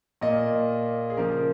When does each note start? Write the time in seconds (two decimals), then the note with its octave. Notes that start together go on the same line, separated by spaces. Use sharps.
0.21 A#2 A#3 D#5
1.10 G#4
1.17 C#3 F3 A#3 A#4